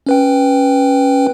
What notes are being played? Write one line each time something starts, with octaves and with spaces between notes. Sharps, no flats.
C#4 B4 G5